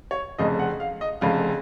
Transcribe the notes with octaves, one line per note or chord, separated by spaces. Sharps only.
C#5
F1 F2 C#3 D#5
F#5
F5
D#5
F1 F2 C#3 F5